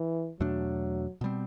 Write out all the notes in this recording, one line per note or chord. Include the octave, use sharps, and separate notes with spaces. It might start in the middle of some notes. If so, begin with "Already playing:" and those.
Already playing: E3
E2 B2 F#3 A3 D4
B2 G3 C4